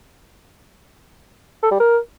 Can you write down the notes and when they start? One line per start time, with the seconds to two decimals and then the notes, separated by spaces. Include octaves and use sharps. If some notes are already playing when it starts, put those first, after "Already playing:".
1.63 A4
1.71 G3
1.80 A#4